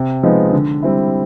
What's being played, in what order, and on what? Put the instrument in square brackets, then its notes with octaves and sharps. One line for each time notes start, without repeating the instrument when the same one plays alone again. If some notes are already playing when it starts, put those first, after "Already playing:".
Already playing: [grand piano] C3
F3 G#3 B3 D#4
D3
G3 C4 E4